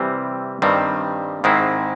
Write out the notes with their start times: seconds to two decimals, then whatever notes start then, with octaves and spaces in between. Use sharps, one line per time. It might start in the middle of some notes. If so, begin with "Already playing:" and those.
Already playing: C3 E3 G3 C4
0.62 G2 D#3 G3 C4
1.44 G#2 D#3 G#3 C4 E4